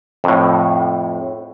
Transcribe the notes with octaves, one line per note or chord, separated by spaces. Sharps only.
F2 A2